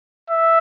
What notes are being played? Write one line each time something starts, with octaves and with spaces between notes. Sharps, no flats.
E5